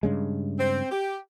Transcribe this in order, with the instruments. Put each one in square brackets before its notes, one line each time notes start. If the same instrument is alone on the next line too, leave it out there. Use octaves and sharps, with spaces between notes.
[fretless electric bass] G2 C#3 G#3
[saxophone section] C4
G4